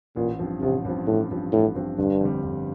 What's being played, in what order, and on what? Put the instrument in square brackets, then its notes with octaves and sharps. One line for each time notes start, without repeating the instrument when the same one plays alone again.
[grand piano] A1 [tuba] A#2
[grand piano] G2 F3 C4
[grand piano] A1 [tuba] C3
[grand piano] G2 F3 C4
[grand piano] A1 [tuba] A2
[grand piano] G2 F3 C4
[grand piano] A1 [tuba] A2
[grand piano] G2 F3 C4
[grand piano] G1 [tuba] G2
[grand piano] F2 D3 G3
G1